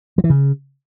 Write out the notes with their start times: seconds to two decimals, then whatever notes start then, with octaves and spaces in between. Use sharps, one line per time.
0.18 F#3
0.24 E3
0.30 C#3